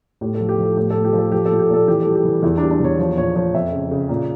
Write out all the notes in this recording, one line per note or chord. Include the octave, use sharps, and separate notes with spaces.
A2 G4
A4
F3
G4
F3 A4
A2 G4
A2 A4
G4
F3
A4
F3 G4
A4
A#2
G4
A#2 A4
E3 G4
G3 A4
G4
E3
E2 E4
D4
G3
D4
E2 C#5
F3 C#5
A#2 C#5
F3 C#5
F2 E5
C#3
C#3
A#2